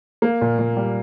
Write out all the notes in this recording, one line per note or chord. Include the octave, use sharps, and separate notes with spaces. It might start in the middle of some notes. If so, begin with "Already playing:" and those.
A#3
A#2
A#2
G3